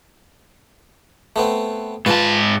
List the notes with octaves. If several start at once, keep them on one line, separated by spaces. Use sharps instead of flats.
A3 B3 C4
G#2 F4 B4 A5